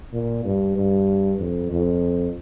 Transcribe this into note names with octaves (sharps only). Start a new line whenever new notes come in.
A#2
G2
G2
F2
F2